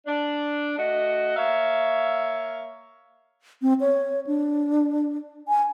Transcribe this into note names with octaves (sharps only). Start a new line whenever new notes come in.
D4
A3 F#4 D#5
A#3 C#5 E5 F5
C4
C#5
D4
G#5